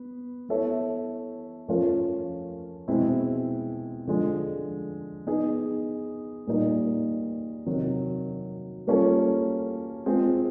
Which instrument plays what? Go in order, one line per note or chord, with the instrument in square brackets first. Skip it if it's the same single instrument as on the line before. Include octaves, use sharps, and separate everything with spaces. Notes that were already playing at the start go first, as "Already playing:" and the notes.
Already playing: [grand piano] B3
B3 E4 A4 C#5 E5
F3 A3 C#4 F4 A#4
B2 G#3 C4 E4
D3 F3 G#3
B3 D#4 G#4
A#2 G3 A#3 D#4
C3 D#3 F#3
G3 A#3 C#4 F4 A4
G#3 C4 F4 G#4